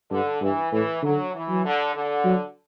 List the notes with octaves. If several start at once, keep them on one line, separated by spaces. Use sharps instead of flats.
G2 D3
G2 E3
A2 E3
D3 F#3
E3
F#3
D3
D3
F#3